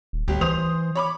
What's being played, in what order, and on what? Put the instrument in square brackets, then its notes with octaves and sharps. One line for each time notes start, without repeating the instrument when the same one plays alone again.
[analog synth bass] D#1
[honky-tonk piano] G1 G4 [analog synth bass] D2
[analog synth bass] E3 [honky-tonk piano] C5 D#6 F7
[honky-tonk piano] C#5 B5 D6